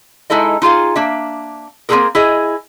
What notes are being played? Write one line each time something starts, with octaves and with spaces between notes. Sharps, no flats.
G#3 D#4 E4 A4 D#5
D#4 F4 G#4 F5
A#3 D4 E5
A#3 C4 C#4 D#4 G#4 A#4
E4 G#4 D#5